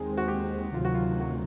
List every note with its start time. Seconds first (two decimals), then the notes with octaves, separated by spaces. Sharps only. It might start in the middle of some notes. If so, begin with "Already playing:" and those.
Already playing: D#2 D#3 G#3 C4 G#4
0.17 F#4
0.28 G4
0.73 D2 C3 D#3 F#3 F4
0.85 F#4
0.94 F4
1.20 F#4